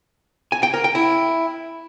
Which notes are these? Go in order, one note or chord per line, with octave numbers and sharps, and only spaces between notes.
G#5
G5
A#4
G5
E4